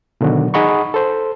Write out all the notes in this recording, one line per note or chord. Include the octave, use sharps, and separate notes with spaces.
B2 D3 D#3 F#3 F#4
D#4 G#4 D#5 F#5 B5 C#6
A4 C5